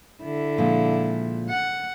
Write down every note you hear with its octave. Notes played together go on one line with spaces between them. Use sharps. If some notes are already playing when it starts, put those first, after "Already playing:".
D3 E4
A#2 F3 G#3
F#5